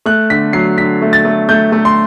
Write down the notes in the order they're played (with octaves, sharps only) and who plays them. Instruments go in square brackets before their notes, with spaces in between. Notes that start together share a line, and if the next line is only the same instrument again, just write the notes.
[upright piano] A3 F#6
D3 B6
F#3 C7
D3 B6
A3
A6
A3
A3 G6
A3
C6